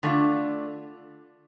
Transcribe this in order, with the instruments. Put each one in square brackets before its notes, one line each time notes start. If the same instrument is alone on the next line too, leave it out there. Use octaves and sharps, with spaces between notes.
[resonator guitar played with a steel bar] D3 A3 D4 F4